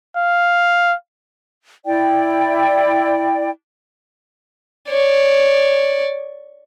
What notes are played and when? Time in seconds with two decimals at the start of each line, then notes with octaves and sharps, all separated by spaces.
0.16 F5
1.86 E4 D5 G5
4.89 C#5 D5